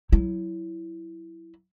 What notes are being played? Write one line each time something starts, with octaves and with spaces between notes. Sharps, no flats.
F#3 E4